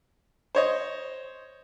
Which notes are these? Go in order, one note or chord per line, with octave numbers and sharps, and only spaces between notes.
C5 C#5 D#5